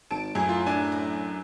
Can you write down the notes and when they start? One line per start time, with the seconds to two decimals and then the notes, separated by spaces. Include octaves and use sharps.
0.11 G#1 A5 D7
0.35 F#2 A2 G#4 C#5
0.49 F4
0.66 D4 G#5
0.92 A#5